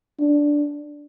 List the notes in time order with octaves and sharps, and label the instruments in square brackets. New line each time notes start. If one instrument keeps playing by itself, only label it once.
[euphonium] D4